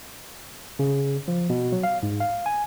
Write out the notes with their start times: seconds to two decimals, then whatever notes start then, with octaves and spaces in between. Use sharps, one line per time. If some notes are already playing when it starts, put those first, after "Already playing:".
0.79 C#3
1.28 F3
1.50 B2
1.72 F#3
1.83 F5
2.03 G#2
2.20 F5
2.46 G#5